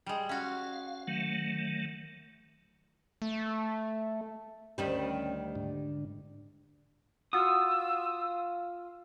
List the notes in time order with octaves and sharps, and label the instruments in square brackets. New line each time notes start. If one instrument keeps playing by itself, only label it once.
[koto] G3 G#3
[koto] C#4 F#4 [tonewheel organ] F5
[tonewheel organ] D#3 F#3 A3
[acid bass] A3
[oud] D2 D#3 G3 [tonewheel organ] C#4
[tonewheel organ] G#2 D3 D4
[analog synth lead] F4 [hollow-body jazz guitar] F#4 [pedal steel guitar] D#6 [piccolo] E6